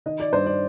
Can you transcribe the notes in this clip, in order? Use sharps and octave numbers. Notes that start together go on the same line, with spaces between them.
D#3 D#5
D5
G2 C5
D5